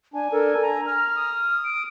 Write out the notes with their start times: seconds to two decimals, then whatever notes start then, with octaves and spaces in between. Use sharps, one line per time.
0.14 D4 G#5
0.33 D4 A4 A#4
0.63 A#5
0.86 A#5 F6
1.16 D#6
1.65 D7